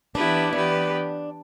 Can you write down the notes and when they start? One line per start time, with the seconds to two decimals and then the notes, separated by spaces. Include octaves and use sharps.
0.15 E3 B3 D4 E4 G4 B4
0.53 E3 B3 D4 G4 B4